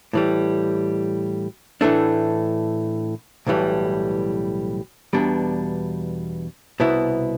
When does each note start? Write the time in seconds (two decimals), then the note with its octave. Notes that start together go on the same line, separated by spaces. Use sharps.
0.13 A2 E3 G3
1.81 A2 E3 A3 D4
3.47 B1 A2 E3 G3
5.13 E2 B2 G3 D4
6.80 C2 B2 B3 E4